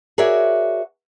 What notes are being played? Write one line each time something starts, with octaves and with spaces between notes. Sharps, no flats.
F#4 G#4 A#4 C#5 D5 E5